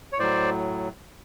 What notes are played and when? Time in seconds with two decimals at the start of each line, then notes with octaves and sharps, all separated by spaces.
0.13 C#5
0.19 A2 F#3 C5 D5